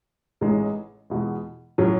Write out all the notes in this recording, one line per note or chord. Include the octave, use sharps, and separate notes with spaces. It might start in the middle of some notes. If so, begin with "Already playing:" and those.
A1 A2 G#3 D#4
E2 B2 G#3
A2 F#3 C#4